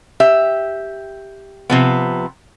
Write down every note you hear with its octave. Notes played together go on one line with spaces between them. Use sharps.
G4 E5
C3 F3 B3